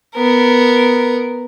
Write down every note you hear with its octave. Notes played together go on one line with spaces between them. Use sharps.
B3 A#4